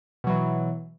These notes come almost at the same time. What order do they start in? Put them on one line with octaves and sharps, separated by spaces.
B2 F#3 E3